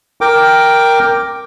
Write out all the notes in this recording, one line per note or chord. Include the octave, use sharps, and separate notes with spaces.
A#4 G5 D6